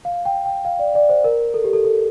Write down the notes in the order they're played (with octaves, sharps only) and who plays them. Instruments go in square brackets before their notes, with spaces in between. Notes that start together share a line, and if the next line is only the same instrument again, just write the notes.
[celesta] F5
G5
G5
F5
D5
D5
C5
A#4
A4
G4
A4
A4